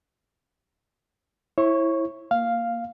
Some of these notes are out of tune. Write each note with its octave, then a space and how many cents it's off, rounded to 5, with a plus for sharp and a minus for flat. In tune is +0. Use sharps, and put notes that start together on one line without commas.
E4 +0 C#5 -40 C#6 +0
A#3 +0 F5 +0